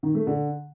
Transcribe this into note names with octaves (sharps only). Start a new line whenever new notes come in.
D#3
A3
D3